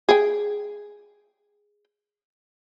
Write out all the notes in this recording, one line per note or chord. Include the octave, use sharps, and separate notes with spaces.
G#4 G5